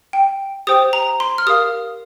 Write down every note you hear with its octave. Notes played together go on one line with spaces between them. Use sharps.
G5
G4 C5 G5 D#6
A#5
C6
F6
G4 A#4 F5 D#6